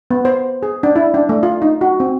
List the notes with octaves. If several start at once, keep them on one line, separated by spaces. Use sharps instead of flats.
B3
C5
G#4
D4
E4
D4
A3
F4
D#4
F#4
C4